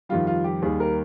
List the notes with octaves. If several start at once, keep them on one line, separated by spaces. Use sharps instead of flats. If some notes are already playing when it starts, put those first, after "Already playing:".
F2 D#3 G3 F4
F4
G4
D#2 D#3 G3 G#4
A#4